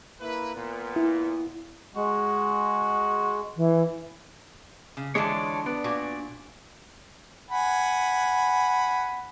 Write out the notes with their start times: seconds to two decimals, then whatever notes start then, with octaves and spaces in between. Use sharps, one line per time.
0.21 A#3 E4 B4
0.55 A#2 B3
0.96 E4
1.96 G#3 F#4
3.57 E3
4.97 C#3
5.15 D3 E3 F3 G#3 C#5 D5 A5
5.66 B3 D4 D5
5.84 A#2 F#4 G#5
7.50 F#5 G#5 B5